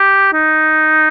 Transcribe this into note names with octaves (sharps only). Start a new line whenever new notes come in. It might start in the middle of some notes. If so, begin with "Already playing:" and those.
Already playing: G4
D#4